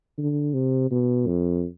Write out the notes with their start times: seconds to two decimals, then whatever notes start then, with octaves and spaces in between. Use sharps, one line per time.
0.18 D3
0.54 C3
0.91 B2
1.27 F2